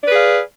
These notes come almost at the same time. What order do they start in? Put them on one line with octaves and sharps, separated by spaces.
D5 B4 G#4 F5